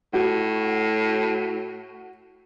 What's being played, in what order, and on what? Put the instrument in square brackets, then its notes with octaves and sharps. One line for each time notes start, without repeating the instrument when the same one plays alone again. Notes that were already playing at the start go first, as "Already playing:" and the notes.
[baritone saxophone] A2 [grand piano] F#4